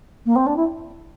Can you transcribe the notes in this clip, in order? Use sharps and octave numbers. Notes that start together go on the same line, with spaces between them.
A#3
C4
D4
E4